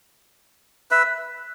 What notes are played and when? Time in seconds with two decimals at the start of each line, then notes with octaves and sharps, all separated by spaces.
0.91 B4 E5